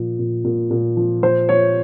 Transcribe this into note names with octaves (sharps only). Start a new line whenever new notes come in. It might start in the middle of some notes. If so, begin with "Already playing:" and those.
Already playing: A#2 F3
A#2
A#2
A#2
F3
F3 C5
F3 C#5